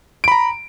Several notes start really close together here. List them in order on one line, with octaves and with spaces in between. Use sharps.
D7 B5 A#5